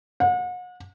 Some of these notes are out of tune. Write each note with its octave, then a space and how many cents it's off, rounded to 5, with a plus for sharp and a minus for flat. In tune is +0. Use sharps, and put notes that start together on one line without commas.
F#5 -40